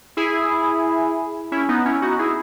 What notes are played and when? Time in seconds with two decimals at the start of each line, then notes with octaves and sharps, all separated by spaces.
0.17 E4 G#4
1.52 C#4 E4
1.69 B3 D#4
1.85 C#4 E4
2.02 D#4 F#4
2.19 E4 G#4